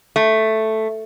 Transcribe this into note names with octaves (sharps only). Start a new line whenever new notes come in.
A3